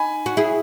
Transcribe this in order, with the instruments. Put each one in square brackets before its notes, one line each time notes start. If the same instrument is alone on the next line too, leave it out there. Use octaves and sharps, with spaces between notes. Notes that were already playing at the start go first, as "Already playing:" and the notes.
Already playing: [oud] D#4 [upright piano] G#5 B5
[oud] F#4
E4 G#4